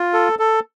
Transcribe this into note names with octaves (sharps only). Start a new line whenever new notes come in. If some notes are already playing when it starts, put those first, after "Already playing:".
Already playing: F4
A4
A4